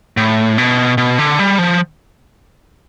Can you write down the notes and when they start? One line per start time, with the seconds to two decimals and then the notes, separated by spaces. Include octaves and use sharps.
0.17 A2
0.58 B2
0.98 B2
1.18 D3
1.39 G3
1.58 F3